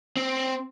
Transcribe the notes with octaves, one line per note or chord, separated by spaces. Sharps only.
C4